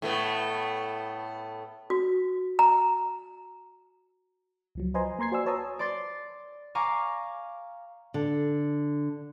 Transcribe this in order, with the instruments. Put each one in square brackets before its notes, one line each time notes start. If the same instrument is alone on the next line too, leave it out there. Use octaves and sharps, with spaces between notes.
[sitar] A2 A3 B3
[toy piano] F#4
A#5
[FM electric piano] C#2 F3 F#3
B4 C5 D#5 G#5 A#5 C6
A#3 A#5 C6 G#6 C7
F#4 C5 D5 G#5 E6
B4 C#5 A5 A#5 D#6 E6
[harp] D5 C6 A6
F5 G#5 A#5 C#6 D6
[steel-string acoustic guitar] D3